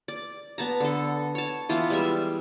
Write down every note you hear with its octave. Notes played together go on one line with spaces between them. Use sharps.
D5
B3 A5 A#5
D3 A4
C#5 A5
E3 B3 F4
G3 G#3 E5